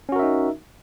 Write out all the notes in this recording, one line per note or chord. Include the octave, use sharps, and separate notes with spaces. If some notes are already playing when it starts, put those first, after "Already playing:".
C#4 D#4 F#4 A#4 E5